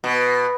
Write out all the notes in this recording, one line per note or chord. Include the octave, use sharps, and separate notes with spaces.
B2